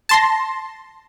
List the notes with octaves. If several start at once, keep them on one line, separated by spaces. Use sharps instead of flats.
A5 C6 A#6